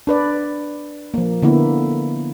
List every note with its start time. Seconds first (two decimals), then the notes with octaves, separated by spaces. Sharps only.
0.07 D4 B4 D5
1.14 F3 A#3
1.42 D3 A#3 B3 E4